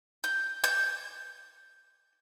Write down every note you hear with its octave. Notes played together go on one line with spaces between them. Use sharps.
G6
G6